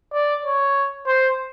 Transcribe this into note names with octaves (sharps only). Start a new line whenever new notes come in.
D5
C#5
C5